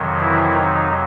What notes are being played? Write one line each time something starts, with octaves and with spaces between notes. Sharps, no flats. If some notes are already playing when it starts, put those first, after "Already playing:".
Already playing: F2 C3 D#3 F#3
E3 E4
D#3 D#4